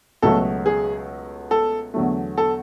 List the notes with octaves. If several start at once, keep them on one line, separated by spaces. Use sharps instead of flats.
C#2 B2 F#3 A3 A4
G#4
A4
E2 D3 F#3 A3
A4